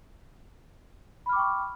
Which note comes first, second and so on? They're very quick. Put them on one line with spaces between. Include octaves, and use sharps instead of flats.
B5 F6 D6 G5 C#6